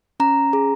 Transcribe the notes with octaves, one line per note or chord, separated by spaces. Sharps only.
C#4 A#5
G#4